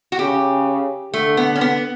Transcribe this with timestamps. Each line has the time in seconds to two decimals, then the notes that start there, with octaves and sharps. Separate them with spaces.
0.12 F#4
0.19 C#3 G4
1.13 D3 A3
1.37 B3
1.56 C#4
1.61 B3